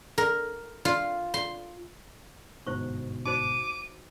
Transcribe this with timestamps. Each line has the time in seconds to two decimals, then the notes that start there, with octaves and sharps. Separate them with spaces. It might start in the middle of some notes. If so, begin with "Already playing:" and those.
0.18 A#4
0.85 F4
1.34 C6
2.67 G1 G#2 B2 E4 C5 C#6
3.26 D#4 F#4 C5 D6 D#7